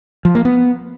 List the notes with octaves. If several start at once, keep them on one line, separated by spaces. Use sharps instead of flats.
F3
A#3
B3